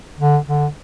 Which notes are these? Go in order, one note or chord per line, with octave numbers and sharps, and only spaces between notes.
D3
D3